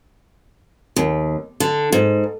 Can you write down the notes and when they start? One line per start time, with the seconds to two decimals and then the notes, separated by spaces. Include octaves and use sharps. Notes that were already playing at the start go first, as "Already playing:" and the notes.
0.96 D#2
1.60 D3
1.92 G#2